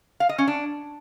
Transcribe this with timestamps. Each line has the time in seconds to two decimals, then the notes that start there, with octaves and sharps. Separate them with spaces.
0.20 F5
0.29 D#5
0.38 C#4
0.48 D4